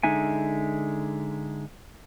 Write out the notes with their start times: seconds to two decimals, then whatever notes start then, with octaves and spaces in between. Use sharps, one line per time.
0.03 D3 G#3 D#4 E5 G#5